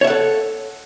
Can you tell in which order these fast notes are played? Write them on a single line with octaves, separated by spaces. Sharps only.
C#5 E5 F#5 A4